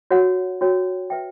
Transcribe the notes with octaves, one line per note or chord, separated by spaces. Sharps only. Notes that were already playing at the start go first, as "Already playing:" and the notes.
F#4 C#5 F#5
F#4 C#5 G5
B4 E5 G5